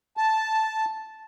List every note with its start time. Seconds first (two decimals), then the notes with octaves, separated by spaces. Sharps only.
0.17 A5